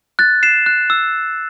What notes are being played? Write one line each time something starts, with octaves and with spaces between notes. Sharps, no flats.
F#6 A6
C7 E7
F#6
E6